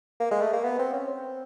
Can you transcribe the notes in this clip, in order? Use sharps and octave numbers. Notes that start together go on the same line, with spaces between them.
A#3
G#3
A3
A#3
B3
C4
C#4
C4